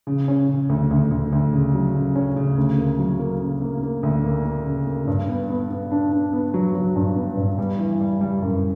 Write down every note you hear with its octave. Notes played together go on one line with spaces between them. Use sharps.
C#3
C#4
C#3
D2
D2
D2
D2
C#3
F#3
C#3
C#4
C#3
D2
A#3
F#3
A#3
C#3
A#3
A#3
D2
A#3
A#3
C#3
A#3
G2
B3
B3
B3
D4
D4
B3
F#3
F#3
G2
B3
G2
G3
E3
G3
G3
F#2